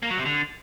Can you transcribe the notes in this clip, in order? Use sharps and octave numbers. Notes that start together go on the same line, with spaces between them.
A#3
F#3
C3
D3